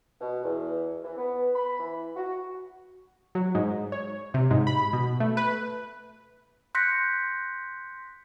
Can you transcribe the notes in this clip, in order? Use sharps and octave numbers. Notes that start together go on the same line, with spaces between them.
B2
E2
E3
B3
B5
E3
F#4
F#3
G#2
C#5
C3
G#2
B5
B2
A3
B4
C6 F#6 G6 A#6 B6 C#7